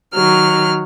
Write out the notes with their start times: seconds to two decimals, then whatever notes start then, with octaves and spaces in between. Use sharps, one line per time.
0.14 D#3 F#3 F6